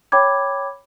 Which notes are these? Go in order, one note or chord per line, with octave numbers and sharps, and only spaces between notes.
C#5 G5 B5 D6 G#6